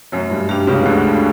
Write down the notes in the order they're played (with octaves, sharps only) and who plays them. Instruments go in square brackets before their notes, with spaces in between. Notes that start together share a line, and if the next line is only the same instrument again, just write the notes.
[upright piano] F#2 F#3 [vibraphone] A3
[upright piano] G2 G3
[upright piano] G2 G3 [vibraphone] D4 G4
[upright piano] C#2 C#3
[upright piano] D2 D3 [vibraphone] A3